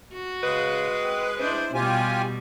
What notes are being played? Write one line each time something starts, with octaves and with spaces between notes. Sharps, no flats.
F#4
C#3 G#3 B4
C4
D4 E4 C5
B2 G3 F4 G4 G#5